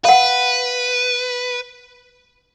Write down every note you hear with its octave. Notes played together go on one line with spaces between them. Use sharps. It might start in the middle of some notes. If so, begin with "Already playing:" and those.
B4 F5 F#5